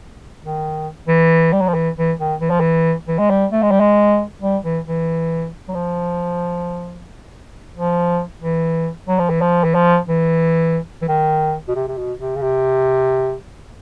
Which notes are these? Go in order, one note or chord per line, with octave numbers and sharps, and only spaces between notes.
D#3
E3
G3
F#3
F3
E3
E3
D#3
E3
F3
E3
E3
G#3
G3
A3
G#3
G3
G#3
G3
E3
E3
F#3
F3
F3
E3
F#3
F3
E3
F3
E3
F3
E3
E3
D#3
B2
C3
C3
B2
C3
C#3
C3